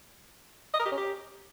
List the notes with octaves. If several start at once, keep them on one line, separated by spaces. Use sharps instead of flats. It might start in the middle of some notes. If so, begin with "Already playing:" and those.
D#5
A#4
G4
C#4
G4